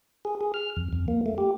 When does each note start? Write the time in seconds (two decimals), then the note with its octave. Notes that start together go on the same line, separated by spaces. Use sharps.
0.25 G#4
0.41 G#4
0.54 F6
0.76 F2
0.93 F2
1.08 A#3
1.26 A3
1.38 G4